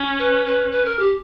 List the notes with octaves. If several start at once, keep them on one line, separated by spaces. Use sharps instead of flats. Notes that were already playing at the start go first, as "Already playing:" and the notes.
Already playing: C#4
B4
B4
B4
A#4
G4